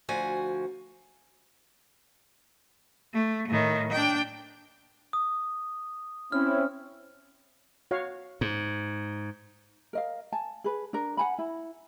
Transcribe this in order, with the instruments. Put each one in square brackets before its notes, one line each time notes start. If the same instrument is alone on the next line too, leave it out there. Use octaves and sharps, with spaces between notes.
[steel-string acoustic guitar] D2 F3 F#4 G#5
[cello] A3
A2 D#3
D4 G5
[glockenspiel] D#6
[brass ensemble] C4 C#4 E4 [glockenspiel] F6
[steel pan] F#4 C#5 F5
[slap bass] G#2
[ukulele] A#4 D#5 F5
G#5 A5
G#4 B4
D4 A#4
F#5 G#5 B5
E4